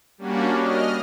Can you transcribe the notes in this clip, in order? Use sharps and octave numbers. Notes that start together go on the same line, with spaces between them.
G3 A#3 C#4 D4 F#4
D#5 F6